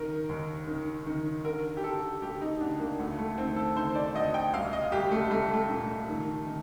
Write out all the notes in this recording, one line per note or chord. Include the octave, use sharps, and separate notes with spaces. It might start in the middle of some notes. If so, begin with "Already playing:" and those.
Already playing: D#3 A#4
D#2
D#3
D#3
D3 A#4
G4
D3 A4
D2 G4
D#4
D2 D4
A#3
D2 A3
A3
D#3 C4
A4
D#3 C5
D5
D2 D#5
G5
C2 F5
D#5
C2 G4
A3
C2 A3
A3
A#2
D#3
D#3